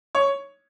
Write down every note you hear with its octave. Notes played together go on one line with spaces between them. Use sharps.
C#5